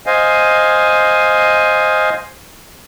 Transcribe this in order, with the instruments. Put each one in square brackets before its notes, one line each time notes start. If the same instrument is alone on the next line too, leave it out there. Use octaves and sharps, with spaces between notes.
[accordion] C5 D#5 F5 G#5